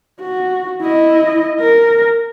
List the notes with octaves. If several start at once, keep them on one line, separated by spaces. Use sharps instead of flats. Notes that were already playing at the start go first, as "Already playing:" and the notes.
F#4
E4 D#5
A#4